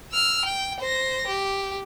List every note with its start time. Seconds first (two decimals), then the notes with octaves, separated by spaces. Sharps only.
0.12 E6 F6
0.45 G5
0.80 C5 A#6
1.27 G4